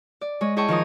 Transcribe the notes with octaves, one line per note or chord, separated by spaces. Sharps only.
D5
G#3 C#5 D#5
E4 G#4 C#5 G5 A5 C#6
D#3 F3 A#4 D#6